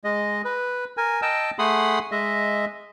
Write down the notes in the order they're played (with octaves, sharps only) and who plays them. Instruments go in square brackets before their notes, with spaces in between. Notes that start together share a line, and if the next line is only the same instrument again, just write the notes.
[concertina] G#3 D#5
B4
A#4 G#5
D#5 G5 A5 E6
A3 G#4 F#5 B5 C6 D#6
G#3 D#5 E5